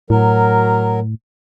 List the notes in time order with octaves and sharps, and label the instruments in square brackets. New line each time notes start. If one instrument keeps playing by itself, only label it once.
[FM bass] A2 [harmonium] F#3 A#4